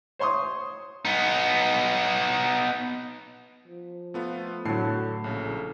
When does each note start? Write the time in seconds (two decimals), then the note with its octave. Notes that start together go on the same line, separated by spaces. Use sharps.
0.19 C5 C#5 C6 C#6 D#6
1.05 B3 D#4
3.68 F3
4.14 A3 B3 F4
4.65 A2 D3 F#3 A4 A5 C7
5.24 A#1 C#3